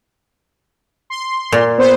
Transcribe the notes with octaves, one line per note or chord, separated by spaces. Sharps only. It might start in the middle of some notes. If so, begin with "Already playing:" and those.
C6
A#2
B3 C5